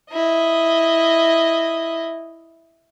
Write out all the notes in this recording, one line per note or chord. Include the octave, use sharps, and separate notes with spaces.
E4 D#5